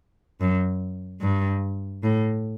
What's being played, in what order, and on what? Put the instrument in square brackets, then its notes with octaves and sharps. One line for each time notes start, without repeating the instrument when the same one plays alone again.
[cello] F#2
G2
A2